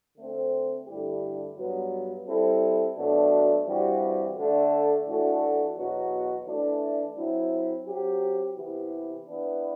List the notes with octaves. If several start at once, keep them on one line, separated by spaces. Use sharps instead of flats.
D3 A3 C4
G2 D3 A3 E4 G4
G2 F#3 B3
G3 C4 E4 A4
B2 F#3 A3 D4
G2 E3 G3 C4 F#4
D3 A3 D4
A2 E3 A3 D4 F#4
E2 B2 F#3 B3 F#4
E3 A3 D4
F#3 C4 E4
F#3 C4 G4
C3 E3 B3 E4 G4
E3 B3 D4